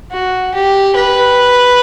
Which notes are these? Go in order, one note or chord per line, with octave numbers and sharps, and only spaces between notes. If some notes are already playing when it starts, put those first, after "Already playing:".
F#4
G4
B4